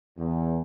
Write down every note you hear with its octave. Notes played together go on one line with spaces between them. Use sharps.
E2